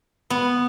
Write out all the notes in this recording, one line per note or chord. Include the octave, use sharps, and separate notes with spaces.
B3